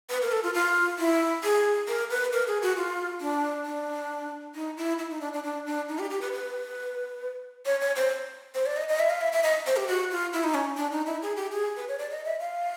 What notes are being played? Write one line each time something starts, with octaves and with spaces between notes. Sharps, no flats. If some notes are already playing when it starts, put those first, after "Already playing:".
B4
A#4
A4
F4
F4
E4
G#4
A#4
B4
A#4
G#4
F#4
F4
D4
D4
D#4
E4
E4
D#4
D4
D4
D4
D4
D#4
G4
G4
B4
B4
C#5
C#5
C5
C5
D5
D#5
D#5
E5
F5
E5
E5
D#5
C5
G4
F#4
F4
E4
D#4
C#4
D4
D#4
E4
G#4
G4
G#4
B4
C#5
D5
D#5
E5
F5